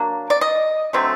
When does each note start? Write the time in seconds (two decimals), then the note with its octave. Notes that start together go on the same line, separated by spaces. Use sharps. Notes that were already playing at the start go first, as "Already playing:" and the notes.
Already playing: F#3 A#3 D4
0.30 D5
0.41 D#5
0.93 D3 F#3 A3 C4